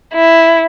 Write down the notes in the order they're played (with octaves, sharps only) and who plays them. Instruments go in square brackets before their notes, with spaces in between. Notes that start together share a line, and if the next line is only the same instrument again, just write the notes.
[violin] E4